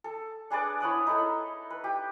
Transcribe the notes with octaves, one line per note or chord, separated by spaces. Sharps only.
A4
D4 G#4 B4 D5
E4 C#5 F#5 D#6
D#4 E4 A4
B4
G4